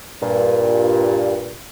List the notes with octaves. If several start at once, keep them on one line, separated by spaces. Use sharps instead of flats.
G2 A#2